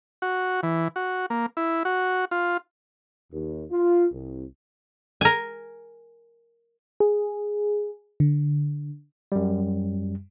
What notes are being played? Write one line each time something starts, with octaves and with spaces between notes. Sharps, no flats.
F#4
E3
F#4
A#3
E4
F#4
F4
D#2
F4
C2
A#4 G#5
G#4
D3
F#2 G3